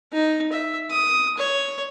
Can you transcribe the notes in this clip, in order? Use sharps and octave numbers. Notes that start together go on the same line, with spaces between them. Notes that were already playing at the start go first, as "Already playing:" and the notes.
D#4
E5
D#6
C#5